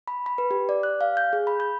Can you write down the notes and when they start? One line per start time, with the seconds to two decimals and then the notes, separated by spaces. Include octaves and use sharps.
0.08 B5
0.26 B5
0.38 B4
0.51 G4
0.69 D5
0.83 F#6
1.01 F5
1.17 G6
1.33 G#4
1.47 B5
1.60 G6